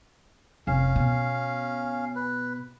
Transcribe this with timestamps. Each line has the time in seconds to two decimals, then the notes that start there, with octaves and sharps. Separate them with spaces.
0.67 F1 C#4 F5
0.96 B2
2.16 B4